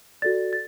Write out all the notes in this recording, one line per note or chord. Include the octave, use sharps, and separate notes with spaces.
F#4 A4 D5 A6
A6